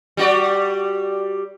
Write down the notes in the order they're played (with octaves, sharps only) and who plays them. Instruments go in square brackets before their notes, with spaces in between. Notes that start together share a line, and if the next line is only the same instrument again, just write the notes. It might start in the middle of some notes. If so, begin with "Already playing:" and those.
[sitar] G3 F#4 D5